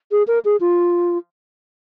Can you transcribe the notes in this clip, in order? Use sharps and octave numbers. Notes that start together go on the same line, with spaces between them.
G#4
A#4
G#4
F4